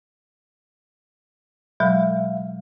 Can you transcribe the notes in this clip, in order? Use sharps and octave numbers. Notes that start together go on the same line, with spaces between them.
B2 F#3 G#3 E5 F5